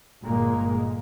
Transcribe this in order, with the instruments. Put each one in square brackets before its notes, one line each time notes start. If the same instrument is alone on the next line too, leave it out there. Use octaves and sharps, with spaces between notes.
[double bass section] G1 A#2 G#3 A#3